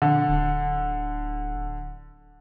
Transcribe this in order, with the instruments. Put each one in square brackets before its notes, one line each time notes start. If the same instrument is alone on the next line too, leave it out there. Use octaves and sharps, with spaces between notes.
[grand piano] D3
[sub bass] D1